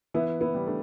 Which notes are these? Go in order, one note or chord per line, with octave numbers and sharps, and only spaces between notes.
E3 B3 E4
B3 E4
G3
A3 D4